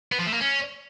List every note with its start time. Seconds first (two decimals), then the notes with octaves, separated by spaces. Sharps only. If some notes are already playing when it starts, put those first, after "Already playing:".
0.12 B3
0.19 F3
0.26 A3
0.33 A#3
0.41 C#4